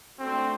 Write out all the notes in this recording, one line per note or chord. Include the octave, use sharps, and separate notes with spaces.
A3 C4 D4 F#4 C5